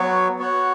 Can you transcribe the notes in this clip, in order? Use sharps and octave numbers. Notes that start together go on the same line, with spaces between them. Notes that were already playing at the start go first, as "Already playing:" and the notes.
Already playing: F#3 B3 F#4 C#5
B3 F#4 C#5 F#5